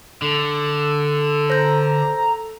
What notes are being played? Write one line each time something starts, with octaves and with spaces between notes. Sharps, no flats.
D3 A4
C5 A#5 G6